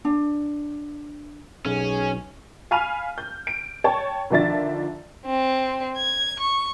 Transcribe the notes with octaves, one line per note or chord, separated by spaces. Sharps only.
D4
B1 C#4 G#4
F5 G#5 B5 F6 D#7 F7
G6
D7
C#5 G5 A5 C#6
D3 D#3 F3 D5 E5 A6
C4
G#6
C#6